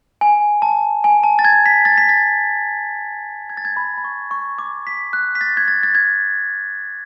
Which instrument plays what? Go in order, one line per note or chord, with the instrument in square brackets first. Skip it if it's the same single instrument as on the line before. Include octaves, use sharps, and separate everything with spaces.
[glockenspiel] G#5
A5
G#5
A5
A6
G#6
B6
A6
B6
A6
G#6
A6
G#6
B5
B5
C#6
C#6
D6
B6
F#6
B6
A6
G#6
A6
A6
G#6